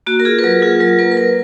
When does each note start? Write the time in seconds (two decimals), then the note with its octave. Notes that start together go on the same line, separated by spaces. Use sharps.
0.07 A#3 F#4
0.20 A#4
0.25 F4 G#4
0.39 B4
0.44 F#3 A#4
0.62 F4 G#4
0.80 F#3 A#4
0.99 A#3 B4
1.12 A#4
1.17 F#3 B4